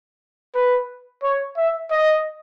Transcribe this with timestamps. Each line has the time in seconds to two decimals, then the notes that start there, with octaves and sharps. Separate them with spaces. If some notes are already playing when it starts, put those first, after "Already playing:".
0.55 B4
1.23 C#5
1.57 E5
1.91 D#5